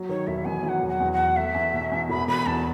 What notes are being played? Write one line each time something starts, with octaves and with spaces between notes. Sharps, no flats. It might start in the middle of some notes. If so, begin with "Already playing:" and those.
Already playing: F#3
D#3 C#5
E1 E5
E2 G#5
F#3 G#5
F#5
E1
F#5
E2
F#5
E2
A3 E5
E2
B2
E2
E1 B5
E1 B5
E2 A5